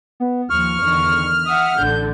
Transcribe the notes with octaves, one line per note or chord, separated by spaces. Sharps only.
B3
D#2 F3 C#6 F6
E2 D3 D#3
E5 F#5 D#6
A1 D3 G6